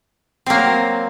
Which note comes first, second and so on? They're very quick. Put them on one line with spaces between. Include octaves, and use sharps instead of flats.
C4 A#3 F#3